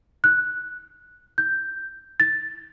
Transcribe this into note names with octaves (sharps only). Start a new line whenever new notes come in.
F#6
G6
A6